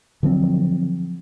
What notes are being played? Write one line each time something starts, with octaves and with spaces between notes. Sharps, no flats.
D3 F3 F#3 C4